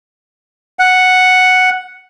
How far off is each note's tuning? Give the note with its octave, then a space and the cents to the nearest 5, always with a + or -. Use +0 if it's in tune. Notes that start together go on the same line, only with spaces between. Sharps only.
F#5 +0